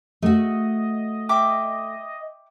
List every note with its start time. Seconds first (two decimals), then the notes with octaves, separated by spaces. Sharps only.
0.22 A3 F#4 D#5
1.29 E5 G5 D6